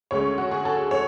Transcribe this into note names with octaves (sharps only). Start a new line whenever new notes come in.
D2 C#3 G#3 C#4 C#5
F#4
G#4
A4
C#5